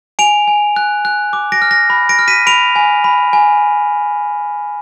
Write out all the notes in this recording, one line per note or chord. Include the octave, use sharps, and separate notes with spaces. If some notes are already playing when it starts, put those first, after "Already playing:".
G#5 D7 F7
G#5
F#6
F#6
D6
A#6 D7
F6
A#6
B5
A#6 D7
F6
B6 D#7
B5 D7 F7
G#5
B5
G#5